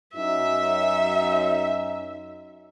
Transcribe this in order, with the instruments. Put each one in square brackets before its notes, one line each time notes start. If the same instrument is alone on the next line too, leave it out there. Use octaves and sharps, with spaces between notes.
[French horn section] F#2 D#4 [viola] E5